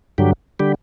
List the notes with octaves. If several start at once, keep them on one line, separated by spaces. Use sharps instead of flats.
G2 D3 F#3 G4
D3 G3 G4